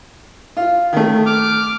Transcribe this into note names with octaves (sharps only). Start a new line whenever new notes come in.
F4
D#3 A3
D6 F6